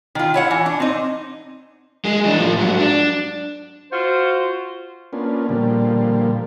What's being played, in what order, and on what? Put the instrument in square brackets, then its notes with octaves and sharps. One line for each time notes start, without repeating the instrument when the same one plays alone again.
[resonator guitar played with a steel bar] D#3 F4
E4 C#5 F#5
E3
D4
C4 D#4
[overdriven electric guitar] G#3 G#4
E3 D4
A2 F3
G#2 F#3
D4
[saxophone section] F4 F#4 [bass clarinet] C5
[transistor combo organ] A#3 B3 C#4 D4 F4
A#2 D3 F3 G3 A#3